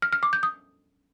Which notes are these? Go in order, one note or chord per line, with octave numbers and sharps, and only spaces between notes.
F6
F6
D6
G6
D#6